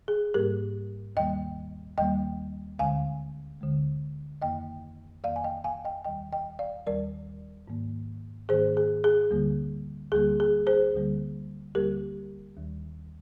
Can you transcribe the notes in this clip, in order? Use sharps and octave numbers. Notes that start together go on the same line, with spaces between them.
G#4
G#2 G3 A#3 G4 A#4
D#2 D#3 G3 A#3 D#5 G5
D#2 D#3 G3 A#3 D#5 G5
D2 D3 G#3 F5 G#5
D2 D3 G#3
F2 D#3 A#3 D#5 G5
F2 D#3 A#3 D5 F5
G#5
D#5 G5
F5 G#5
D#5 G5
D#2 D#3 G3 D#5 G5
D#5 G5
D5 F5
D#2 D#3 G3 A#4 D5
G#2 D#3 A#3
G#2 D#3 A#3 G#4 C5
G#4
G#4
D2 D3 G3 A#3
D2 D3 G3 A#3 G#4
G#4
G#4 C5
D2 D3 G3 A#3
D2 D3 G3 A#3 G4 A#4
D#2 D#3 G3